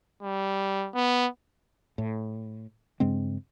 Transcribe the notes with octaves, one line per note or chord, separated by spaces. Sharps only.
G3
B3
A2
G2 C#3 G#3 C4